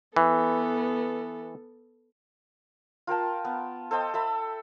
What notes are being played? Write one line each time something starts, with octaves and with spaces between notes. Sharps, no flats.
E3 B3 A4
F4 A#4 G5 A5
B3
A4 C5 D#5 G5
A4 E5 B5